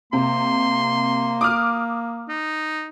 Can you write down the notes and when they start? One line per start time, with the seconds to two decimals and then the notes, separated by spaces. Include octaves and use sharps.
0.13 C3 A#3 C6
1.41 D6 D#6 F6
2.29 D#4